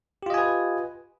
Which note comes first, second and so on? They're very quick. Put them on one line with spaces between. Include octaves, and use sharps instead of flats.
G4 F4 D#5 G#5 B4